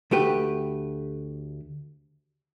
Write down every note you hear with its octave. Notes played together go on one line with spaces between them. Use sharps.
D2 A3 G4 B4